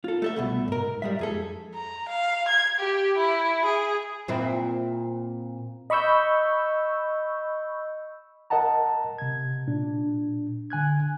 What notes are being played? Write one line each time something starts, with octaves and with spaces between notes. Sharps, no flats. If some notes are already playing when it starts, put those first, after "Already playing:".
F4 A4
A3 A4 E5
C2 B2 A3
G#2 A#4
G3 G#3 E5
F2 G#4 A4
A#5
F5
G#6
G4
E4
G#4
A#2 C4 E4
D#5 B5 C#6 E6 G6
A#4 D#5 F#5 A5 A#5
C3 G#6
A#2 D4
D3 G#5 F#6 G#6